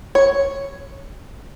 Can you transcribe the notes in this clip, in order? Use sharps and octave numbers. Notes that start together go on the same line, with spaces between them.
C#5